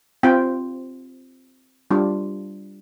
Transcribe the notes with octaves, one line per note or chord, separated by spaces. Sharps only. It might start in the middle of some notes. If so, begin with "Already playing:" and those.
C4 F4 G5
G3 D4 F4